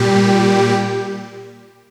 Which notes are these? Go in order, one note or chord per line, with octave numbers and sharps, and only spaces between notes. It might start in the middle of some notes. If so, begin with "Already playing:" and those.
Already playing: A#2 G3 G4